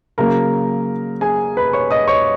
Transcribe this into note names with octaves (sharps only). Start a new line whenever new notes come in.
C#3 F#3 A#3 A#4 A#5
G#4 G#5
B4 B5
C#5 C#6
D#5 D#6
C#5 C#6